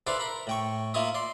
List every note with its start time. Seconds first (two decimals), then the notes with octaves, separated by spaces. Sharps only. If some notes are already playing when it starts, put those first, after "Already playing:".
0.07 E4 A4 B4 C5 D5 F5
0.19 A#4 B5
0.47 A2 G5 C#6
0.94 A#3 E4 F4 D#5 E5
1.15 D5 C6